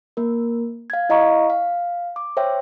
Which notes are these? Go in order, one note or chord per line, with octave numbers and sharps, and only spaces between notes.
A#3 A#4
F5 G#6
E4 D#5 F5 A#5 C#6
F5
D6
C5 C#5 E5 G5